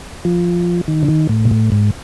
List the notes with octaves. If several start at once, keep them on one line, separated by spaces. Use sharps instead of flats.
F3
D#3
D3
D#3
A2
A#2
A2
G#2